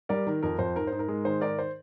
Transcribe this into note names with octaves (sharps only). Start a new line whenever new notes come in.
G3 A#4 D5
D#3 A#4
F2 A#4
F2 C5
G#2 A#4
G#2 C5
A#4
G#3
D#3 C5
G#2 A#4 D5
C5